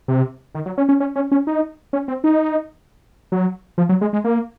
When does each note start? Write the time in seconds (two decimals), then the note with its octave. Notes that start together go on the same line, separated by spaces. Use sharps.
0.08 C3
0.55 D#3
0.66 F#3
0.78 C#4
0.89 C#4
1.00 C#4
1.16 C#4
1.32 C#4
1.47 D#4
1.93 C#4
2.08 C4
2.24 D#4
3.32 F#3
3.78 F3
3.89 F#3
4.01 G#3
4.13 G#3
4.24 A#3